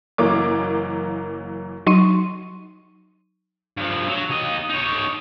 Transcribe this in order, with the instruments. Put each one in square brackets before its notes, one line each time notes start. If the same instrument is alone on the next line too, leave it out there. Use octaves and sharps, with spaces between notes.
[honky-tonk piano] F#1 E3 F#3 A#3 D6
[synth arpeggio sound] F#3 D#4 C6 C#6 D#7
[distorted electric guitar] G2 F3
F#3
D#2 D#5
D#4 C#5